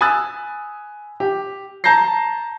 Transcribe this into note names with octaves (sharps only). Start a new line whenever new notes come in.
G#5 B5 D#6 E6 F#6 A6
G4
A5 A#5 G6 A#6 C7